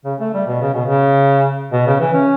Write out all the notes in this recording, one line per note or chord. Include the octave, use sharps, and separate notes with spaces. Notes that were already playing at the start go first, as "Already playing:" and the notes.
C#3
A3
G3
B2
C#3
B2
C#3
B2
C#3
E3
C#4